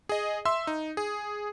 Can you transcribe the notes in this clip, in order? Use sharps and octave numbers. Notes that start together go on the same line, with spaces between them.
G#4 D#5
E5 C6 E6
D#4
G#4